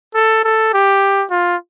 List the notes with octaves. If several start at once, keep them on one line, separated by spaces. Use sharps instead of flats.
A4
A4
G4
F4